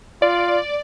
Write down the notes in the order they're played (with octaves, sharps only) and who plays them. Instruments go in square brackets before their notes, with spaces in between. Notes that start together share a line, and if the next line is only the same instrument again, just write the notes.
[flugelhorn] F4 [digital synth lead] D5